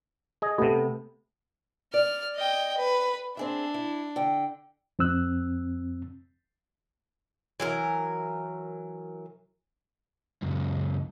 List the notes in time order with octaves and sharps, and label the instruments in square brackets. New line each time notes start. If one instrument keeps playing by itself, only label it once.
[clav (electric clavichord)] G#4 D#5
[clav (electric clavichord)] C3 B3 [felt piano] A3
[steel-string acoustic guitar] D5 [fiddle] F6
[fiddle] D#5 G5
B4
[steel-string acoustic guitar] C4 G#4 E5 [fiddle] D4
[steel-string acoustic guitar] E4
D3 G5
[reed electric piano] F2 C4 E6 F#6
[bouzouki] E3 F#3 A#4
[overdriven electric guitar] C#2 F#2